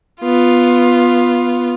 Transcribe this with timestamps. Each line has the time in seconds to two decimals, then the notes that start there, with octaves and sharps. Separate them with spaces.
0.21 B3 F4